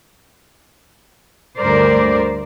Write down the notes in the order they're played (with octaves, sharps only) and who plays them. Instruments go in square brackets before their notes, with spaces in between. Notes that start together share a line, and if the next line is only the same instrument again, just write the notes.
[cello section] D2 G2 A#4 C5 D5